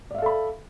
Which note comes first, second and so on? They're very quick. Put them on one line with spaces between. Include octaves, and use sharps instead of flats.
D5 E5 F5 A4 B5